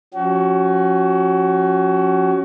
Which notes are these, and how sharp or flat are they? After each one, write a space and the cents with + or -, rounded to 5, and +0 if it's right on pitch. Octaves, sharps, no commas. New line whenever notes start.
F3 +35 C#4 +0 F#4 +30